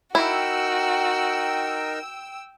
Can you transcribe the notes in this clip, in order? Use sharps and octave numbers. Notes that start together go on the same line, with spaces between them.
D#4 E4 F#4 A#4 G5 E6